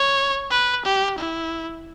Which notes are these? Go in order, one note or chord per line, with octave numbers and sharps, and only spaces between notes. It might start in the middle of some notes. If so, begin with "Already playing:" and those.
Already playing: C#5
B4
G4
E4